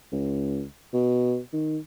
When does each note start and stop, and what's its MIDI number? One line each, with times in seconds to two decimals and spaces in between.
0.12 0.64 37
0.93 1.38 47
1.53 1.78 51